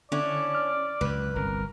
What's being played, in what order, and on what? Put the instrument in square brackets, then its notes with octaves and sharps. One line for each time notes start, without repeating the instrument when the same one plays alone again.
[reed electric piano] D3 [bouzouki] C#4 D4 E4 [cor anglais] D5
[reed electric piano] F6
[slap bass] C#2 F#2 [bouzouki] B4
[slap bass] G1 C2 [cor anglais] A#4